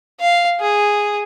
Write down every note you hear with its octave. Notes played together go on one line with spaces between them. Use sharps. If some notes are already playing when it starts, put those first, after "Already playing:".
F5
G#4